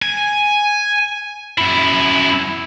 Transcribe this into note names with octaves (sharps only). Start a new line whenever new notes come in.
G#5
F#2 E4